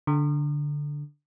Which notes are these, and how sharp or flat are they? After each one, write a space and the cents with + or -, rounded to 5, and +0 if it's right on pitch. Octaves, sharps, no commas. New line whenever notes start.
D3 -5